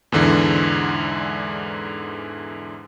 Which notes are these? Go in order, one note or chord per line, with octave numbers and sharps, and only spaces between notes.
E2 G#2 D3 E3